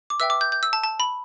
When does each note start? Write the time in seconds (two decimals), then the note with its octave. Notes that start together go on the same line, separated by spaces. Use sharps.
0.10 D6
0.20 B4 E5 G5 E6
0.30 D6
0.41 G6
0.52 G6
0.63 E6
0.73 A5
0.83 A5
1.00 B5